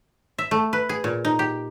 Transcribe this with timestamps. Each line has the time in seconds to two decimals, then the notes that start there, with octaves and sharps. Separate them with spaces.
0.38 E5
0.51 A3
0.73 B4
0.89 G#4
1.04 A#2
1.25 D#4
1.39 G4